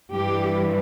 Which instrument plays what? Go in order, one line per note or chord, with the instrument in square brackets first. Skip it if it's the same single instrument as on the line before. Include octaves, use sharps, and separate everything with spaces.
[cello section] G2 E3 G3 G4